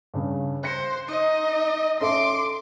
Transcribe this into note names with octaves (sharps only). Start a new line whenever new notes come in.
G2 C#3
C5 F#6 A#6 C#7
D#4 D#5
C#4 A4 E5 C6 D6